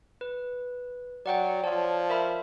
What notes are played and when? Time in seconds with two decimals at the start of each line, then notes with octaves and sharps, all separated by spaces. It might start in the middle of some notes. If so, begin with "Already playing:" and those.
0.21 B4
1.26 F#3 D5 F#5 G5
1.64 F3 C#5 D5 A5
2.10 A#4 E5 B5